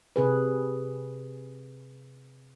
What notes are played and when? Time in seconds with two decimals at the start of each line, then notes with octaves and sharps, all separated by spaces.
0.16 C3 G#4 B4